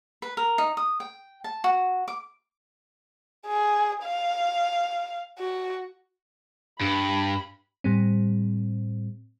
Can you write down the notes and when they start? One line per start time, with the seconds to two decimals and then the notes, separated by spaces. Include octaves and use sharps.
0.22 B4
0.37 A#4
0.58 D#4
0.77 D#6
1.00 G5
1.44 A5
1.64 F#4
2.08 D6
3.47 G#4
4.04 F5
5.39 F#4
6.81 G2 B5
7.84 A2 G3 C4